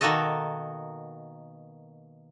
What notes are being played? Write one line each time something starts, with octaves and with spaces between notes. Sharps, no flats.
B2 D#3 A#3 F#4 A4 D#5